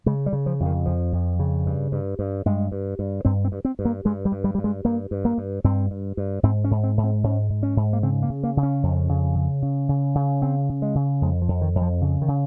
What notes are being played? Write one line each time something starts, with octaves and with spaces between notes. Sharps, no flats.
C#3 G#3
G3
C#3
F3
F2
D#3
F2 F3
F2
C#3
G2
G2
G2
G2 G#3
G2
G2
G2 C4
C4
G2
C4
G2
A#3
G2 G#3
G3
G2
G3
G2 G3
G#3
G2 A#3
G2
A#3
G2
G2 C4
G2
G2
G#2 C4
C#4
G#2
C4
G#2
C4
G#2 C#4
G#2
C#4
G#2
A#3
C#3 C4
A#3
C#3
A#3
C#3
C#4
F2
C#3
C#3
C#3
C#3
C#3
C#3 C4
C#3
G#3
C#3
F2 G#3
F3
F2
D#3
F2
F3
C#3
D#3
C#3